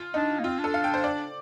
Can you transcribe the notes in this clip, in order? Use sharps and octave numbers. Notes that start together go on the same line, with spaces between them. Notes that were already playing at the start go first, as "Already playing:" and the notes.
Already playing: F4
D4 D#4
A#3
C4 F4
D4 A4
F5
G5
C5
D5